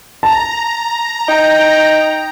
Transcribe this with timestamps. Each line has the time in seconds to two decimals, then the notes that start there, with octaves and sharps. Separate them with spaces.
0.23 A5 A#5
1.28 D#4 G5